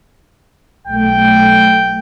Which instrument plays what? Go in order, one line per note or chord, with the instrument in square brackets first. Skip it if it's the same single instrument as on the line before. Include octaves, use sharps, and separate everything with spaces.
[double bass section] B1 A3 [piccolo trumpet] G5